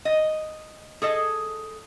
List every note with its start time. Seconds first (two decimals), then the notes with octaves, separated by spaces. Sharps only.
0.05 D#5
1.02 G#4 A4 D#5